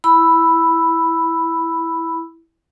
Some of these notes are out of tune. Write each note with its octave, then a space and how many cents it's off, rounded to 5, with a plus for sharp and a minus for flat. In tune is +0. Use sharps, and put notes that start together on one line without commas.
E4 +0 B5 +0 E6 +0